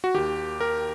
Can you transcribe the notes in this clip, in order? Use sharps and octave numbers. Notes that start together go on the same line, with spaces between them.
F#4
D#2 D#3 G4
A#4